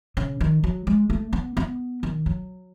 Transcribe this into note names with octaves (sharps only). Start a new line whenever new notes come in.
C#3
D#3
F#3
G#3
A3
B3
B3
D#3
F#3